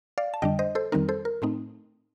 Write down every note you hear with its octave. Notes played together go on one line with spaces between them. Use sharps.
D5 F5
A5
F2 D3 G3 D4 D#5 G5
C5 D#5
A4 C5
F2 D#3 G3 C4 D#4 A#4
A4 C5
A#4
A2 A3 C4 D#4